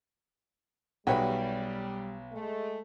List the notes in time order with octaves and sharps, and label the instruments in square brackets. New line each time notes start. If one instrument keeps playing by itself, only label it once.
[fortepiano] B1 F#4 B4 [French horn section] G3 [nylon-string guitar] G#4 C#5 G5
[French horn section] G#3 A3